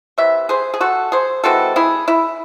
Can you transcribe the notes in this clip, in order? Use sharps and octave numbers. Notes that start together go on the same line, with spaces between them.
C3 E3 E5
G#4 C5
G#4
F#4 A4
G#4 C5
E3 G#3 C4 F#4 A4
E4 G#4
E4